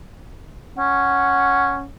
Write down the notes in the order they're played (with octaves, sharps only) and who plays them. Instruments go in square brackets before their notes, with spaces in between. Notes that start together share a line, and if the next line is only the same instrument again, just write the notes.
[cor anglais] C#4 [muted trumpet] F#5